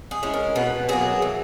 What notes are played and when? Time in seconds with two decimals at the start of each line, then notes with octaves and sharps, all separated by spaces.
0.11 G#4
0.23 G#3 C#4 E4
0.34 A#4
0.56 B2 B4
0.89 F#3 A#3 G#4
1.22 E3